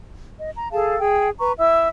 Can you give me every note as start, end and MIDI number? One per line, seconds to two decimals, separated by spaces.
0.39 0.50 75
0.56 0.71 82
0.72 0.98 68
0.72 0.98 69
0.72 0.98 77
0.72 0.98 81
1.00 1.30 68
1.00 1.30 79
1.39 1.53 71
1.39 1.53 82
1.39 1.53 85
1.58 1.88 64
1.58 1.88 76
1.58 1.88 88